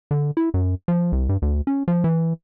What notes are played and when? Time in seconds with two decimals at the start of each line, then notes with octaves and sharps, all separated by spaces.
0.11 D3
0.37 E4
0.54 F#2
0.88 F3
1.12 C2
1.29 G2
1.42 D2
1.67 C#4
1.88 F3
2.04 E3